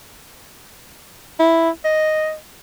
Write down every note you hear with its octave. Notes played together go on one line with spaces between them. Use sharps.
E4
D#5